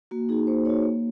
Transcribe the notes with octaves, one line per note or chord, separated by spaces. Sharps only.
A#3 F#4
D#4 F#4 G#4
A#3 C5
D#4 F#4 C#5
A#3